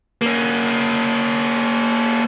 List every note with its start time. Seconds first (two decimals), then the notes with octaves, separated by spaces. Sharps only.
0.22 A#3 C#4